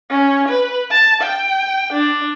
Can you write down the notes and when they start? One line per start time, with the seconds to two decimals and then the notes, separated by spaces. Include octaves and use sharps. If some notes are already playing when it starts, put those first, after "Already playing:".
0.11 C#4
0.48 B4
0.91 A5
1.22 G5
1.93 D4